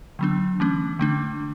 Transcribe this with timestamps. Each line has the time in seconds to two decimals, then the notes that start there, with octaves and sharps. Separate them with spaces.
0.19 D3 F#3 B3 D4
0.60 E3 A3 C#4
0.99 D3 A3 D4